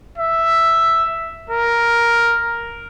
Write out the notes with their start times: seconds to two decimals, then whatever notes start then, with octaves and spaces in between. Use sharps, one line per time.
0.18 E5
1.50 A#4